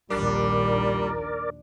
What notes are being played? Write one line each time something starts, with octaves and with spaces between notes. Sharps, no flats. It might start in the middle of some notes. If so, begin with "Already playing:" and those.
A#1 D#2 A#2 G3 D4 A#4 D5